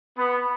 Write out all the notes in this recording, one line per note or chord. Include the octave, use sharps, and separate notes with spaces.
B3